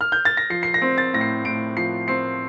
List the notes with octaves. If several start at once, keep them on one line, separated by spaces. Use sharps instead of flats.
F6
G6
A6
A#6
F3 C7
C7
A#6
C4
A6
A2 A#6
C7
A2 D7
F3 C7
C4 C7